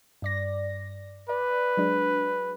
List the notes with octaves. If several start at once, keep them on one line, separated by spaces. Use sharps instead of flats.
G2 D5 A#6
B4 D5
F#3 G#3 D4